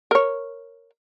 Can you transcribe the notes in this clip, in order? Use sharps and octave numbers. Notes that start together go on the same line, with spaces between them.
A#4 C#5